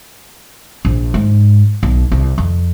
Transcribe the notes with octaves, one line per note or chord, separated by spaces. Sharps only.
A#1
G#2
B1
C2
F2